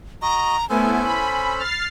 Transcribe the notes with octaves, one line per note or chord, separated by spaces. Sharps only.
F#4 D#5 A#5
A3 B3 C#4 E4 A4 C5 G#5
B5
F6 A6 C7